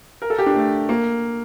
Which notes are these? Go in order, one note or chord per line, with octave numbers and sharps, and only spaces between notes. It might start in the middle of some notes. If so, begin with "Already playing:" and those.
A#4
A4
G4
D4
A3
A#3